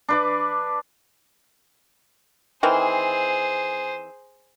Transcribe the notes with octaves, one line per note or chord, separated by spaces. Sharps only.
D4 B4 D6
D#3 E3 C4 G#4 C5